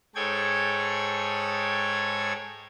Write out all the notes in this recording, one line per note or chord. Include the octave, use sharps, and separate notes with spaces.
G#2 G#4 A4 C#5 G5 G#6